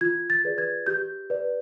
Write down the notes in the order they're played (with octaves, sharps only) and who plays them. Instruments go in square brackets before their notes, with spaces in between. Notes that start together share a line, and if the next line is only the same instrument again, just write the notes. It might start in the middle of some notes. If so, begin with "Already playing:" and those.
[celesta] F4 G#6
A6
G#4 B4 D5
G#6
G4 G6
B4 D5